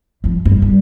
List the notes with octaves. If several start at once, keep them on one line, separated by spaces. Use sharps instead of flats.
F2 F3
G2
G3